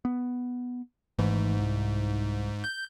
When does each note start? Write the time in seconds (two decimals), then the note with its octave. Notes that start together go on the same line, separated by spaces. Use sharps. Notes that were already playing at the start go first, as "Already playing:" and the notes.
0.05 B3
1.19 G#1 G#2 E3 A3
1.59 C2
2.64 G6